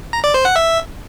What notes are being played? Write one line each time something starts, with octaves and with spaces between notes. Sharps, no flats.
A#5
D5
C5
F#5
E5